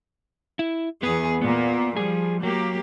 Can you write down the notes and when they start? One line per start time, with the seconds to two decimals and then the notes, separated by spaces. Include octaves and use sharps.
0.59 E4
1.03 E2 B3 G#4 B4
1.42 A#2 A#3 B3
1.97 F3 G3 G#4
2.43 F#3 A#3 G4